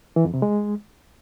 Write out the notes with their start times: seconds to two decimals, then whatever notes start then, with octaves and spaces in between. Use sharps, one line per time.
0.16 E3
0.25 F2
0.34 C3
0.42 G#3